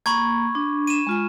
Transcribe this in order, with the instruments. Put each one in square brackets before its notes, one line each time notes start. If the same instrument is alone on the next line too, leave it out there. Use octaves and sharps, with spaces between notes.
[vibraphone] A#3 [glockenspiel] B5 C#6 G#6
[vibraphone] D4
[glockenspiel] D#7 E7
[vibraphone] G#3 F4 G#5